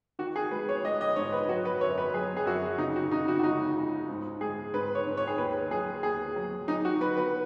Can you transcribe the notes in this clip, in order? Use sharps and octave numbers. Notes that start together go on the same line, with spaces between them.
D#3 F#4
G#4
G#3 B4
C#5
G#3 D#5
D#5
G#2 C#5
B4
F#3 F#4
B4
F#2 C#5
B4
F#3 G#4
G#4
F#2 F#4
C#3 D#4
F#4
C#3 D#4
F#4
F#4
C#2 D#4
C#2
G#2
G#3 G#4
G#2 B4
C#5
G#2
C#5
G#4
D#2 B4
F#3 G#4
D#2 G#4
F#3
F#3 D#4
F#4
F#3 B4
B4